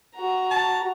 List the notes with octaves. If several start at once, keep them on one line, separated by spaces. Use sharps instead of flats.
F#4 A#5
A5